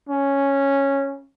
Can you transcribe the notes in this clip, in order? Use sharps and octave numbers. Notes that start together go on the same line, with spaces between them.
C#4